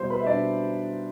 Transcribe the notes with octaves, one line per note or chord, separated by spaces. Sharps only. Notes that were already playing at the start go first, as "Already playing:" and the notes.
Already playing: B2 G3 C5 C6
B4 B5
E5
B2 G3 D4 D5